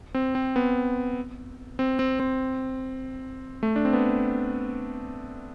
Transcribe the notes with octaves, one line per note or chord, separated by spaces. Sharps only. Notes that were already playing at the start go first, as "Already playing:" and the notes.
C4
C4
B3
C4
C4
C4
A3
D4
C4
B3